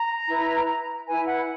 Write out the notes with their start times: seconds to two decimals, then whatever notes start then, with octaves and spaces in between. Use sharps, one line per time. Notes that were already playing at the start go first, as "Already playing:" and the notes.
Already playing: A#5
0.27 E4 B4
1.07 E4 B4 G#5
1.27 F#5